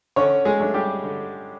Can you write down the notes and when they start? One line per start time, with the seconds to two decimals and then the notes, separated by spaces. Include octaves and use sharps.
0.16 D3 C#4 C#5
0.45 G#3 G#4
0.60 F#3 A3 D4
0.74 G3 G4
1.04 D3